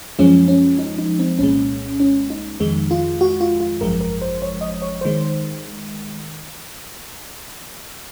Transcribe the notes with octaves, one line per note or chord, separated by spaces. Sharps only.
F#2 F3 G#3 C#4
C#4
D#4
D#4
C4
C2 A#2 G#3 C#4
C#4
D#4
F2 D#3 G#3
F4
F#4
F4
F4
G#1 F#2 F3 G#3 A#4
A#4
C5
C#5
D#5
C#5
D#3 G#3 C5